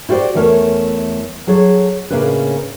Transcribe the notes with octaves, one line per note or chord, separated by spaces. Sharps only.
E4 F#4 G4 C5 D5
E2 E3 A3 A#4 C5 C#5
F#3 G#4 A4 C#5
A2 C#3 A#3 C#4 D4 B4